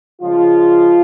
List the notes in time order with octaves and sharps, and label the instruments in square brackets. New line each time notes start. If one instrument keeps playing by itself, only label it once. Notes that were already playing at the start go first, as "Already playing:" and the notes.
[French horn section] C#3 F3 G#3 F4